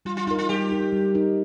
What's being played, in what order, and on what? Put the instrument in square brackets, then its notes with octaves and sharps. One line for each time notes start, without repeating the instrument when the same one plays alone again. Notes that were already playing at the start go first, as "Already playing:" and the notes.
[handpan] G3 [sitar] F4
[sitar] F4
[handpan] D#4 [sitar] F4
[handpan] A#4
[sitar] F4
[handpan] G3 [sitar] G4
[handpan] D#4 A#4
G3
D#4 A#4